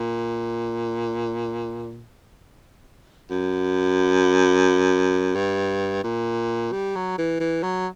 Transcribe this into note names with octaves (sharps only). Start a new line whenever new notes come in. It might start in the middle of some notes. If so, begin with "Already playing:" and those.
Already playing: A#2
F#2
G2
A#2
G3
F#3
E3
E3
F#3